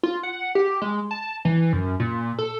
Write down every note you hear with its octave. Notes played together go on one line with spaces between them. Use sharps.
F4
F#5
G4
G#3
A5
E3
F#2
A#2
A4